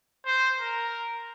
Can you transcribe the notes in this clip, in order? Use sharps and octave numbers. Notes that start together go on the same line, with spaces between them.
C5
A#4